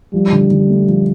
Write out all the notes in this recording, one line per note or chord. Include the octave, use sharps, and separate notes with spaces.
F3 G3
D3
D3
A3
F3